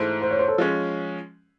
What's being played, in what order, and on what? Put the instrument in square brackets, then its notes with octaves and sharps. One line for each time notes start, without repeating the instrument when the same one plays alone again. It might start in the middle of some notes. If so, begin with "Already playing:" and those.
Already playing: [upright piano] G#2 E3 A3 [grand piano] C5
[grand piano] C5
C#5
C5
A4
[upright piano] F3 G#3 C#4